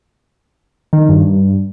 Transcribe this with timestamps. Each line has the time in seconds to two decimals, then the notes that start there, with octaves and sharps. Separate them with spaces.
0.93 D#3
1.09 G2